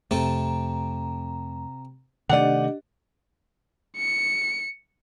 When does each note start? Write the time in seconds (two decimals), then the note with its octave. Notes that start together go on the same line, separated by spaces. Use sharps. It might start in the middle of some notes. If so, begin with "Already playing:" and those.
0.11 F2 C3 A3 C4 A4 A#5
2.29 C3 D#3 A3 D4 G4 D5 D#5 F#5
3.97 C#7